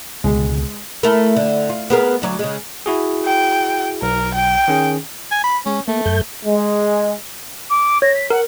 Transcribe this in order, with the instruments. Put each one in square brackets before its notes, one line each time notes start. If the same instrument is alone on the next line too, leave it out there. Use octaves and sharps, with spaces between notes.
[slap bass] C#2 B2 D3 [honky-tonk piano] G#3
[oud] A3 E4 A#4
D3
F4
B3 G#4 A#4
D2 F#3 D5
C#3 G#3
[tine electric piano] E4 F#4 G#4
[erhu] G5
[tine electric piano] B1 [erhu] A#4
[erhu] G5
[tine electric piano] D#3 C#4 G#4
[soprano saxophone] G#5
B5
[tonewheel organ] G#3 [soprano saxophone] C#4
[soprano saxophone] A3 [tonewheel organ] A#3
[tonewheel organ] F#2 A4 G6
[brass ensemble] G#3
[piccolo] D6
[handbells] C#5 [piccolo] A#6
[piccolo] B6
[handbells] A#4 [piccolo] F#5